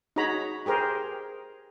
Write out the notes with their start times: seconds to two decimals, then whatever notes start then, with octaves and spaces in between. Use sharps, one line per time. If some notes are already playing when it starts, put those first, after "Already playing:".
0.16 D#4 F#4 G#4 C#5 A#5 B5
0.66 G4 G#4 A#4 C5